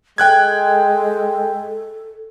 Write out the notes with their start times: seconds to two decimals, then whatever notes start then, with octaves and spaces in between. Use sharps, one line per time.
0.18 G#3 A4 G5 F#6 G#6